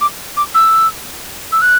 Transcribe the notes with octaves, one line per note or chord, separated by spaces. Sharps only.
D6
D6
E6
E6
F#6